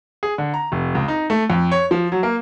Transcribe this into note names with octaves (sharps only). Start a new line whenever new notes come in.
G#4
D3
A#5
F1
C#2
D#4
A3
F2
C#5
F3
F#3
A#3